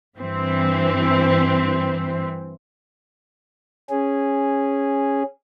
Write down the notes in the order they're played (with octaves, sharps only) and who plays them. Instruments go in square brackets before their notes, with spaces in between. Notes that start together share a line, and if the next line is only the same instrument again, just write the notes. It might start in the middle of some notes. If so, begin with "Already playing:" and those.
[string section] G2 E3 C4
[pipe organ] C#4 G#4